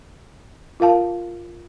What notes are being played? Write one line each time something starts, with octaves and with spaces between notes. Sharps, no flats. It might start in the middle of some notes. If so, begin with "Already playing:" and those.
F4 A#4 F5 A5